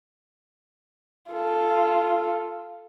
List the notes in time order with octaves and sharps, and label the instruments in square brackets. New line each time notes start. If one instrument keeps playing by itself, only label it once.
[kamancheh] F4 A4